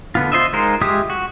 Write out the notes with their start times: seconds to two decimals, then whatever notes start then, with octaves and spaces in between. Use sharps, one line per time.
0.15 D3 B3 F4
0.32 F4 C5 D#5 E5
0.53 G#3 D#4 F4 A#4 C5
0.81 G#3 F4 G4 E5 D#6
1.10 F#4